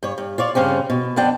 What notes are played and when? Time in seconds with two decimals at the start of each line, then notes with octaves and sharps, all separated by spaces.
0.03 G2 C#5
0.18 G2
0.38 F4 C#5 D5
0.55 G2 C#3 C4 C#4
0.90 B2
1.16 F2 B3 D4 G5 A5